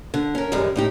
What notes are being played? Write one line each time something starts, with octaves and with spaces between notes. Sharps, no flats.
D3
C#4 A#4
F#2 D#3 E3 G3 G#3
A2 D#4 G4